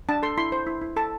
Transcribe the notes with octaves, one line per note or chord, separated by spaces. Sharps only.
D4 A5
A4 C6
E4 C6
C5
E4
E4
A4 A5